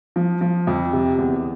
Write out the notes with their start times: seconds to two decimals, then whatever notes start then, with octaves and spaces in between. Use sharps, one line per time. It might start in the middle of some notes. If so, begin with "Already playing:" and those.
0.16 F3
0.41 F3
0.67 F2
0.93 C3
1.18 E2